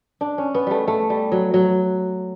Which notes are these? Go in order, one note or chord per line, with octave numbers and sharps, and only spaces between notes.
D4
C#4
B3
G3 A3
A3
G3
F#3
F#3